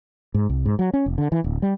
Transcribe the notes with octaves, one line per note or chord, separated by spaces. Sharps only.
G#2
C2
G#2
F#3
C#4
F1
D3
E3
D1
G3